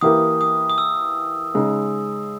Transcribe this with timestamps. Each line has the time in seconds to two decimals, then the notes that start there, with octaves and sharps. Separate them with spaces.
0.01 E3 A#3 E4 G4 A#4 D#6
0.41 D#6
0.70 D#6
0.78 E6
1.54 C#3 G#3 D#4